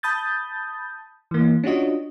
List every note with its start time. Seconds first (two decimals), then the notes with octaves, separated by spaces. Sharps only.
0.03 A5 B5 D#6 G6 A6
1.31 E3 A#3
1.64 C#4 D4 F4 F#4 D#5